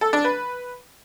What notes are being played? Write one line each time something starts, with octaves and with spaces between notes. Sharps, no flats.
A4
D4
B4